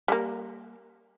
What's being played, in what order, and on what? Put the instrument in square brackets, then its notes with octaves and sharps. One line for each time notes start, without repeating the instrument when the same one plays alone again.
[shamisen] G3 A3 A#3